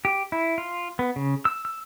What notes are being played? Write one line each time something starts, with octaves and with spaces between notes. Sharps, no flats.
G4
E4
F4
B3
C#3
E6
E6